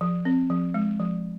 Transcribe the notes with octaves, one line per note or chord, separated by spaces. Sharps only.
F3
C4
F3
G#3
F3